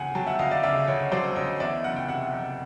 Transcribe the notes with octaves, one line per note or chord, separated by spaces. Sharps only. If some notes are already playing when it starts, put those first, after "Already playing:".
Already playing: D2 C#3 F#5 G#5
F#3 G5 A5
E5 F#5
D2 D#5 F5
D5 E5
C#3 D5 E5
D2 C#5 D#5
F#3 C5 D5
D2 C#5 D#5
E2 D5 E5
F#1 F#5
G5
C3 E5 F#5
F#1